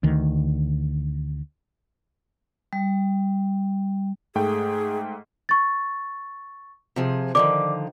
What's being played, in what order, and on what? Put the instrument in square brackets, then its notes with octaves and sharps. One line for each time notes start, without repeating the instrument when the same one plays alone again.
[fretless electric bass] D2 D#3
[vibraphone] G3
[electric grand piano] G#2 A3 G5 [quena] G#4
[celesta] C#6 A6
[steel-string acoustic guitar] C3 F3 G#4
[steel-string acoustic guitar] D3 D#3 F3 [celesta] D5 D6